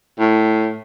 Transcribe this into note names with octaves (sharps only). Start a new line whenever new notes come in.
A2